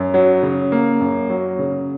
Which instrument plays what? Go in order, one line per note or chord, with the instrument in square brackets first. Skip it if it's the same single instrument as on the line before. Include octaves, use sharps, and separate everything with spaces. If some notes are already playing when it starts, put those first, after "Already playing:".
Already playing: [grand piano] F#2
F#3
C#3
A#3
F#2
F#3
C#3